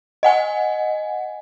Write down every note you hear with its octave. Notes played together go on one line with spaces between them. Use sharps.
D#5 F#5 G#5